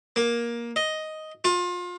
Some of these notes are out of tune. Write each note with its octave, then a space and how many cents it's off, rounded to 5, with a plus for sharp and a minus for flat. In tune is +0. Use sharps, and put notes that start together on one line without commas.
A#3 +15
D#5 +5
F4 +30